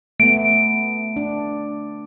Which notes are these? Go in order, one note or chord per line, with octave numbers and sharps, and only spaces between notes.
A3 B3 D7
D4